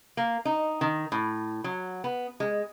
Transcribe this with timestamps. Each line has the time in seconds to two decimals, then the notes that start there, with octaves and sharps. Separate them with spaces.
0.17 A#3
0.45 D#4
0.81 D#3
1.12 A2
1.64 F#3
2.04 B3
2.40 G#3